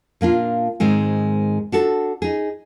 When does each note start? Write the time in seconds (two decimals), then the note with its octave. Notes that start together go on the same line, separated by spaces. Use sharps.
0.21 A#2 A#3 D4 F4
0.80 G#2 D#3 G#3 C4
1.72 D4 F#4 A4
2.22 D#4 G#4